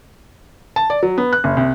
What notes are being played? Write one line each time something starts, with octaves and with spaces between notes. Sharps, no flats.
A5
D5
F#3
B3
F#6
F#1
C2